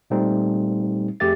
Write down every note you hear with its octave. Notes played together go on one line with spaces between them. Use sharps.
A#2 G3 A3 C4 D#4
F2 A3 G4 G#4 E5 A6